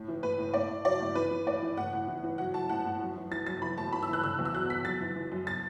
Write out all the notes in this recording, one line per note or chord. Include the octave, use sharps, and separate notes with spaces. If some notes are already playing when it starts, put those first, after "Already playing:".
Already playing: A2
E3
A2 B4
A2
A2 D5
A2
F#3 D5
A2
E3 B4
E3
A2 D5
E3
A2 F#5
A2
E3
E3
F#3 F#5
F#3 A5
A2 F#5
A2
F#2
E3
E3 A6
F#2 A6
E3 B5
A2 A5
E3 B5
E6
E3 F#6
D3 E6
E2
E6
F#3 F#6
F#3 B6
F#2 A6
E3
E3
F#2
A6